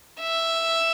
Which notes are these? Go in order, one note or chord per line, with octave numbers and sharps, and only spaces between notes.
E5